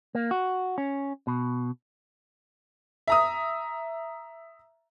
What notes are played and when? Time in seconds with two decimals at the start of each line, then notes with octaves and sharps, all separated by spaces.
0.15 A#3
0.31 F#4
0.78 C#4
1.27 B2
3.08 E5 A#5 D#6